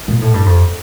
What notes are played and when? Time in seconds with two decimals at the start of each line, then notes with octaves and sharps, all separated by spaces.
0.08 A#2
0.21 A2
0.34 G2
0.46 F2